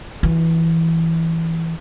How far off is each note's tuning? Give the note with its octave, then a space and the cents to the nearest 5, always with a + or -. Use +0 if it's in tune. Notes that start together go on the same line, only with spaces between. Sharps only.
E3 -5 F4 +45